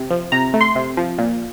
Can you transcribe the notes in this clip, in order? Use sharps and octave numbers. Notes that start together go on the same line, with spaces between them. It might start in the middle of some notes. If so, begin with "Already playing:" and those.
Already playing: C3
F3
C3 A#5
A3
C6
C3
F3
A#2